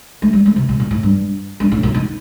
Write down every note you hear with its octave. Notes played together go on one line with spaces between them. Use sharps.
A3
G3
A3
C3
A#2
A#2
A2
G2
G2
A2
A#2
D#3